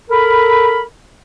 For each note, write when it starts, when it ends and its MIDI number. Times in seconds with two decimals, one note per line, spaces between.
0.11 0.82 69
0.11 0.82 70
0.11 0.82 83